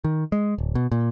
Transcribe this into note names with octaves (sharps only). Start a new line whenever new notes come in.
D#3
G#3
D1
B2
A#2